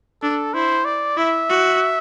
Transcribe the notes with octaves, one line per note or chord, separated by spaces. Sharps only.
D4 A4
E4 C5
D5
E4 E5
F#4